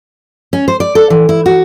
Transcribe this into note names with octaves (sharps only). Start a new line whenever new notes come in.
C#4
C5
D5
A4
E3
E4
F#4